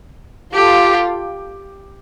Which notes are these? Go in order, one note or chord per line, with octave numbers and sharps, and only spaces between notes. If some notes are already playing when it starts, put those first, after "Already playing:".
F4 G4 A4